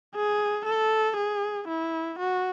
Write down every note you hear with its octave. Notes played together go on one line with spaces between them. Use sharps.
G#4
A4
G#4
E4
F#4